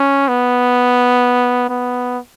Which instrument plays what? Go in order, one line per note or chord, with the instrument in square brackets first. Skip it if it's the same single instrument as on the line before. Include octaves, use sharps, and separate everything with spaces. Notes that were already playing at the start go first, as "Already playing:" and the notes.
Already playing: [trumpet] C#4
B3
B3